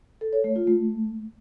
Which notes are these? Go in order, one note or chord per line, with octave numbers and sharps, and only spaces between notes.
A4
C#5
A3
F4
A3